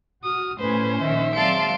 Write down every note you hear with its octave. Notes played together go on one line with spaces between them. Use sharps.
F#4 D#6 F6
A2 C#4 B4 C5 G#5
A#1 D#3 E5
F#3 G#3 C4 D5 F5 A5 C6 D7